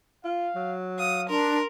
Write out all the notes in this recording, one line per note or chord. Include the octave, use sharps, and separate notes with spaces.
F4 F5
F#3
F5 D#6
D4 A#4 C6